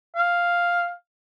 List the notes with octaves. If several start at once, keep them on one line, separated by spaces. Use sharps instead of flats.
F5